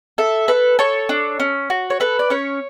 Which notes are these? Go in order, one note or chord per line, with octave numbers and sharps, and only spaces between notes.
A4 E5
A4 B4
A4 C#5
D4
C#4
F#4
C#5
A4 B4
D5
C#4 C#5